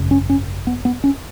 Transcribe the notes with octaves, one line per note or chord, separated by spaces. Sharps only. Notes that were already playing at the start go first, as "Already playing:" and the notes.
Already playing: G#1 F#2 C#3
C#4
C#4
B3
B3
C#4